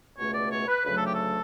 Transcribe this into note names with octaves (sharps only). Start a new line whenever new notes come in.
C#2 B2 A3 C#5
D5
C#5
B4
D2 C#3 F#3 A3 B4
A4
G4
A4